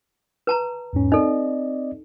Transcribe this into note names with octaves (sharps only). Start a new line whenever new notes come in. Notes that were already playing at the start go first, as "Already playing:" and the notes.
B4 A5 A#5
E2 G#2 C#4
C4 D#4 A4 D5 D#5